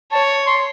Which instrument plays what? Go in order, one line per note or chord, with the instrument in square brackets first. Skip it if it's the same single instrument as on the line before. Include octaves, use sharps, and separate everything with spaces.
[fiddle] C#5 [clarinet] A5
[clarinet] C6